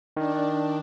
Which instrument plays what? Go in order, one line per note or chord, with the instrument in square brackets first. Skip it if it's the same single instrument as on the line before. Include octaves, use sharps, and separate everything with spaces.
[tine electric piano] D#3 [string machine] D4